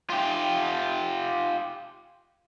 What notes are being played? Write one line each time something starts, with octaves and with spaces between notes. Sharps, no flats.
F4 G4